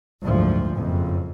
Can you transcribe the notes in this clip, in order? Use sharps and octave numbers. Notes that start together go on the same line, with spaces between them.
F#1 D2 G#2 F3
F#1 F2